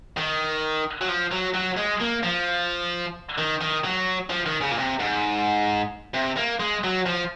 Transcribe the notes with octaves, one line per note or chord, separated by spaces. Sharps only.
D#3
F#3
F3
F#3
F#3
G#3
A#3
F3
D#3
D#3
F#3
F3
D#3
C#3
A#2
C3
G#2
C3
A#3
G#3
F#3
F3